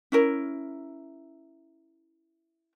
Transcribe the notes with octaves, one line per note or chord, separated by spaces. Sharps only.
C#4 E4 A#4